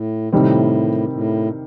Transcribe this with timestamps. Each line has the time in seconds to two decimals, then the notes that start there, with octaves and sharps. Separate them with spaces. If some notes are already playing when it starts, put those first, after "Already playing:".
Already playing: A2
0.33 A2 C3 D#3 G3 C4
1.13 A2